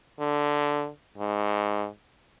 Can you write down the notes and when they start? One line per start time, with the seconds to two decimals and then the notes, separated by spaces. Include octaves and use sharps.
0.20 D3
1.18 G#2